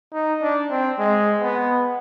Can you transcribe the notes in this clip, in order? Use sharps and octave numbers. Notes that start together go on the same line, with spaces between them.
D#4
D4
C4
G#3
B3